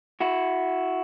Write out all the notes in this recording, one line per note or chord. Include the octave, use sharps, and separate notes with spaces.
E4 F#4